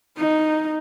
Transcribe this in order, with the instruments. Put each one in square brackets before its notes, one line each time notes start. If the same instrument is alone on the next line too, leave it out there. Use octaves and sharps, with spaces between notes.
[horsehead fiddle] D#4